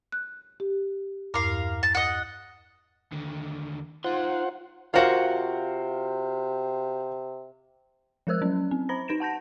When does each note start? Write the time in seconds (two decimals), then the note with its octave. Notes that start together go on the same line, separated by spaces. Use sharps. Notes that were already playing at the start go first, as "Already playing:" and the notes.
0.12 F#6
0.60 G4
1.34 E2 G2 A#4 F5 D6
1.83 A5
1.95 D#5 F#5
3.13 D#2 D3
4.04 D#4 F4 C5 F#5 C6
4.94 C3 F4 F#4 A#4 C5 F5
8.27 F3 G#3 A#4 C5 E6 F#6
8.42 F#3 C#4
8.71 C4
8.89 C5 A#5 B5 A#6
9.08 D#4 B4 A#6 D7 E7
9.20 F#5 A5 G6 A#6